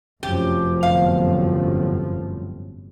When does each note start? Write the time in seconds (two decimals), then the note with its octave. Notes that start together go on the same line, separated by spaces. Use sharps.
0.23 F1 F#2 F3 G4
0.83 G1 F#2 A2 F5